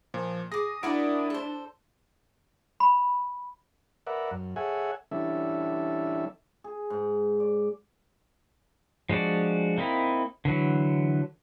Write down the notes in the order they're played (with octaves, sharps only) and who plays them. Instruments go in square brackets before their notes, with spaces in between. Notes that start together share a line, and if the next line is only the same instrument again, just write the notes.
[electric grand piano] A#2 [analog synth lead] F3
[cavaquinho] G#4 D6 [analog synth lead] D#6 [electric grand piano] A#6
[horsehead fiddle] D4 [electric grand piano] E4 E5 D7 [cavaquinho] F#4 A#4 D5
[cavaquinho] A4 C5
[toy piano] B5
[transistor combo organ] A#4 B4 D5 E5 F#5
F#2
G#4 A4 C#5 E5 F#5 G#5
E3 G3 C#4 D4 A4 E5
[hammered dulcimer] G#4
G#2
D5
[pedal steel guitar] F3 G#3 D4 F#4 D5
A#3 C4 D#4 E4
D3 E3 F#3